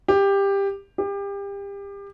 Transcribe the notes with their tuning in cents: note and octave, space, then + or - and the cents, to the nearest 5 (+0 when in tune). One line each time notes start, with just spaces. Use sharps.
G4 +15
G4 +30